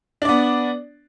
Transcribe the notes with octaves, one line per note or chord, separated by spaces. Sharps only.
B3 D4 D5